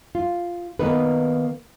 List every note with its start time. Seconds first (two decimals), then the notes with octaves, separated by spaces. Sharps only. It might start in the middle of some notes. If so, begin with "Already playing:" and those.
0.15 F4
0.79 D#3 A#3 B3 D#4 A#4 B4